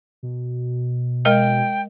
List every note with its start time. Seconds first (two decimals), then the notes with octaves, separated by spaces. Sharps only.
0.23 B2
1.25 G#3 A#4 D#5 G5